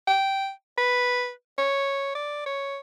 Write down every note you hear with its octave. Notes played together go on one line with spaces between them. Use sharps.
G5
B4
C#5
D5
C#5